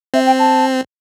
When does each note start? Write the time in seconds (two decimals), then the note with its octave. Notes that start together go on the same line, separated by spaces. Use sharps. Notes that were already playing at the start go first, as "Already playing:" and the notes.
0.14 C4 E5
0.26 G5
0.39 A5